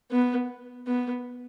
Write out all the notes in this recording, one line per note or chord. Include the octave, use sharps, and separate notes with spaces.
B3
B3